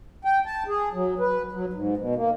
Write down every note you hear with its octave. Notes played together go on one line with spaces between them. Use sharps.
G5
A5
G#4
F#3
B4
F#3
G#2
B2
A#3